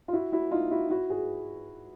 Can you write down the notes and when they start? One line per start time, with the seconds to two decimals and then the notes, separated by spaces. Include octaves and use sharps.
0.08 F4
0.13 E4 F#4
0.32 E4 F#4
0.51 D#4 F4
0.71 E4 F#4
0.90 E4 F#4
1.10 F#4 G#4